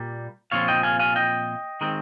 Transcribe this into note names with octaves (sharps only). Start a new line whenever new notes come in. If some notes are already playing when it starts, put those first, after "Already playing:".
Already playing: A#2 G3 A#3
A#2 F3 C4 F4 C#5 F5
D#5 G5
F5 G#5
F5 G#5
D#5 G5
D#3 G#3 C4